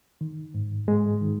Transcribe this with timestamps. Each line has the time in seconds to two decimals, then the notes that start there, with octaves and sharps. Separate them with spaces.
0.21 D#3
0.54 G#2
0.87 G#2 G#3
1.21 D#3